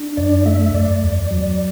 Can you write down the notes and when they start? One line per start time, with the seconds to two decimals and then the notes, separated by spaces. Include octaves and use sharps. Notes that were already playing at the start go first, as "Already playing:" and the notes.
Already playing: D4
0.17 F#2 D5
0.46 A3 E5
0.74 F#2 D5
1.03 E2
1.31 F#3